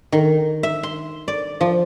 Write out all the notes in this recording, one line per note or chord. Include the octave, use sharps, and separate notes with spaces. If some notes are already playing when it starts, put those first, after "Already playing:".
D#3
E5
C6
D5
F3